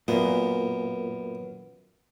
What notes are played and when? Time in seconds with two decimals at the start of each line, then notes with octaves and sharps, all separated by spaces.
0.08 F#2 A#2 B3